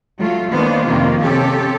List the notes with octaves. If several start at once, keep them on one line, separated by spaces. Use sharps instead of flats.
F#3 A3 F4
D#3 A#3 B3 D4 C5
F2 C3 D#3 A#3 F4
C3 C#4 G4 A4